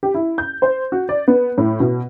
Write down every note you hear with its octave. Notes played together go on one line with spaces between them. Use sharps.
G4
E4
G6
C5
F#4
D5
B3
A2
B2